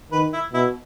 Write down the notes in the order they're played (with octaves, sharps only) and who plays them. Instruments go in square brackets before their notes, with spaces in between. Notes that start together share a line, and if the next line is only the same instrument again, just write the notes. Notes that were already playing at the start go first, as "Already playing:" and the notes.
[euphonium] D#3 [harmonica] B4
[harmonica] E4
[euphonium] B2 [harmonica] E4